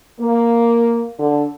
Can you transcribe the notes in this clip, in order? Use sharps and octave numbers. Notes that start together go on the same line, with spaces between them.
A#3
D3